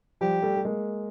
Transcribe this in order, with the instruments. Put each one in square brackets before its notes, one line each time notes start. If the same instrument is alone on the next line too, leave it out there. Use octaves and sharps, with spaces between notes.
[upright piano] F3 G3 [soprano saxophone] G4
[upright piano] G3 A3
A3
G#3 A#3